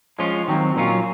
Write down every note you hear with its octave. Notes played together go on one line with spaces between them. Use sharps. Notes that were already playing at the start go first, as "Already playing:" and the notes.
F3 G#3 C#4 F4
D#3 F#3 C4
A#2 F#3 C#4 F4